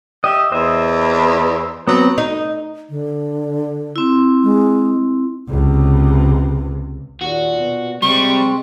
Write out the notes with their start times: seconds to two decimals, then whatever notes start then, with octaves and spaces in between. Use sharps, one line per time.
0.24 G4 D#5 E5
0.52 E2 C5 D#5 E5
1.88 F#3 B3 C4
2.18 D#4
2.89 D3
3.96 C4 E4
4.43 G#3
5.50 C#2 C3
7.21 D#2 A#2 F#4
7.60 B2
8.02 C3 G3 G#3 C4 C#6